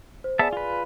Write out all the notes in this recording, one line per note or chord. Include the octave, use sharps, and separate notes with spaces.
C5
B3 G#4 D5 E5 G#5 A5
F4 B4